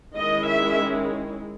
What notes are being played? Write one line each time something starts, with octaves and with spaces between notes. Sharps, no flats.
D#3 G#3 C#4 E4 D#5
E5